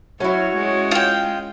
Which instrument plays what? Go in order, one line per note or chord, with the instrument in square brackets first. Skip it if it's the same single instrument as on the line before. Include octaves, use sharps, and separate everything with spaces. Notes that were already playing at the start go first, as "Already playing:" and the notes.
[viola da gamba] F#3 [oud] C#4 E4 [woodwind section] F#4 C#5
[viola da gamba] G#3
[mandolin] F4 G5